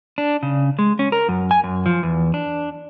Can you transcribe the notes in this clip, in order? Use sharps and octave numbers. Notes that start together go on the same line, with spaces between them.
D4
C#3
G#3
C#4
A#4
F#2
G#5
F#2
F3
E2
D4